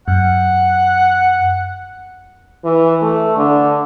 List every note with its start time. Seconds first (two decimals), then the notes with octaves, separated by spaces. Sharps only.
0.08 F#2 F#5
2.64 E3
3.02 A3
3.37 D3